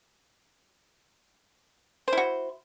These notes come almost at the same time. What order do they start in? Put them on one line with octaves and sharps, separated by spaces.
C5 E4 F#4